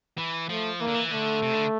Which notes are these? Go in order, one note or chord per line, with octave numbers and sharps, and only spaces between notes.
E3
F3 A3
E3 A#3
D3
E3
D3 A3
C3
D3